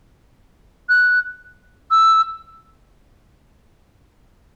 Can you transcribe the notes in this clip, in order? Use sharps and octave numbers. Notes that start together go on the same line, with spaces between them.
F#6
E6